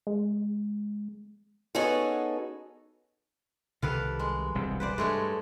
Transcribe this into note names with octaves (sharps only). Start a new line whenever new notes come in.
G#3
B3 C#4 D#4 F#4 G#4 A4
C2 C3 D#3 A4 B4 F5
G#3
E1 C2 C3
B4 C5 D5
G2 G#3 A3 C#5